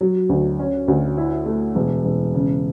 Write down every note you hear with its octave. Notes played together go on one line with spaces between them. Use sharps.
F#3
D2
C#4
D2
E4
A3
E1
E1
C#3